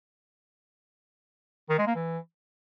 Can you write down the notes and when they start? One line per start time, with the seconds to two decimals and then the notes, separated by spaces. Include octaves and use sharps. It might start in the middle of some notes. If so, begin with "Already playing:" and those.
1.69 D#3
1.78 G#3
1.87 A#3
1.95 E3